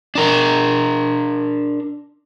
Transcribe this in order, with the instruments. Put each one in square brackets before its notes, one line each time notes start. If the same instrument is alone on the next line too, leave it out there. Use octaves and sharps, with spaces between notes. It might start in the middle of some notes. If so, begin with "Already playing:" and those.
[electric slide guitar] D4 A#4